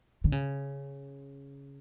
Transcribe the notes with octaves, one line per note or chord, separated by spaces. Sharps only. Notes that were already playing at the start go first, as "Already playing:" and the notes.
D3
C#3